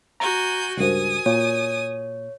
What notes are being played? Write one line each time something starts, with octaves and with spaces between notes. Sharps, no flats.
F#4 G#5 A#5 G6
C#2 G2 F#4 A#4 C5 G#5 D#6
A#2 C#5